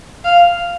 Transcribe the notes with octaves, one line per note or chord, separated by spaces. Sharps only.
F5